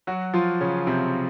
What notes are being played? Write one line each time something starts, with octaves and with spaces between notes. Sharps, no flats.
F#3 F#4
F3 F4
C#3 C#4
C3 C4